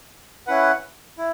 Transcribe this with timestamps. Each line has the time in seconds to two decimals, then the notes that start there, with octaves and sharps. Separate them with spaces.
0.47 C#4 E4 B4 F#5
1.18 E4